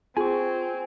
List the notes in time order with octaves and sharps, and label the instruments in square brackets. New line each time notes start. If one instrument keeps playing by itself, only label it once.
[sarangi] C4 [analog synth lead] F4 [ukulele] G#4 [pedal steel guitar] G#5 C#6